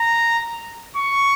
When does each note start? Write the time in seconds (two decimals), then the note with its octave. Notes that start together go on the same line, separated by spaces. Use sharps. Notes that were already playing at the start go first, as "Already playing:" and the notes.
Already playing: A#5
0.97 C#6